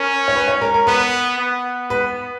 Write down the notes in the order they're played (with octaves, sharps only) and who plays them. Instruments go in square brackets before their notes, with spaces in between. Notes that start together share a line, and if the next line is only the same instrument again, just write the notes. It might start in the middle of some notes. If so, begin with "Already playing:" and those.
Already playing: [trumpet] C#4 [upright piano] A#4
[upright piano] C#5
B4
C#5
A#4
A#4
[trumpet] B3 [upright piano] B4
[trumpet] B3
[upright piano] B4